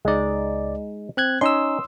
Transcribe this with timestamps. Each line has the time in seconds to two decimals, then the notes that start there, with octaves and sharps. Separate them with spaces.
0.05 C#2 G#3 D#4 D5
1.17 C4 F#6 G#6
1.41 C#4 D#4 C6 D#6 E6